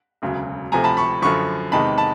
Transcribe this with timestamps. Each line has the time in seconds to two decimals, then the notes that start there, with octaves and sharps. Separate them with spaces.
0.22 E1 D2 C#3 F#3
0.72 D2 C3 F3 A3 G#5 A#5
0.84 A5 B5
0.97 B5 C#6
1.22 F#2 D3 F3 B5 C#6
1.72 E2 C3 D#3 G#3 A5 B5
1.98 A5 B5